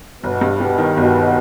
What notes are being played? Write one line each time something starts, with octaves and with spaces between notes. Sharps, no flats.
G1 B2
G2
B2 G3
D#3
G1 B2